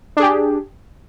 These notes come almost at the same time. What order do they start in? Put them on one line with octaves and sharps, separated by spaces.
D4 G#4 G4